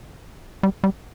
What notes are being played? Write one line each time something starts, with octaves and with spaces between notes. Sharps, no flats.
G3
G3